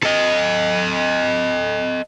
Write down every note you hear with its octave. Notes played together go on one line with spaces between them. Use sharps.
A4 D#5